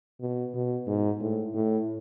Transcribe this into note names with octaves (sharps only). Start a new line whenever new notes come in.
B2
B2
G#2
A2
A2